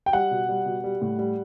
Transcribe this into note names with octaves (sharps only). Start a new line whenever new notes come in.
G5
G3 F#5
B2
G3
B2
G3
A2
G3